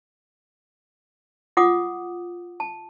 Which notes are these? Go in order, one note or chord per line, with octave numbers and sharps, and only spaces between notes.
F4 F#5 D6 D#6
A5